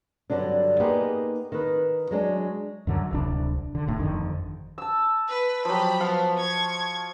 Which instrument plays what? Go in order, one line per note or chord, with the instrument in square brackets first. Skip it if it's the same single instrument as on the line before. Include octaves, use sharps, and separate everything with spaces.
[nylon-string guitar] G2 D3 F#3 D4
A#3 B3 D#4 G4 G#4 C5
D#3 B4
F#3 G#3 D4
[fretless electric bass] F#2 D3 F#3
D1 C2 D4
D3
F1 A2
G1 F2 D3 D#3
[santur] A5 E6
[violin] B4
[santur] F3 F#3 [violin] G4 B5
[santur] F3 F5 [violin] B3
[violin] C#6 G#6